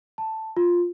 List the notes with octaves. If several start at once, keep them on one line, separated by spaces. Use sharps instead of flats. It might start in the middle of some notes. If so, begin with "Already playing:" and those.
A5
F4